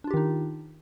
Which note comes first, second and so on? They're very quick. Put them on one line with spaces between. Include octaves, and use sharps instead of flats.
D4 F4 G4 D#3 D#4